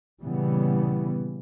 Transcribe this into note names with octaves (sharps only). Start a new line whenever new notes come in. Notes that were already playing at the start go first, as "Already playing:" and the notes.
A#2 C#3 E3 G3 B3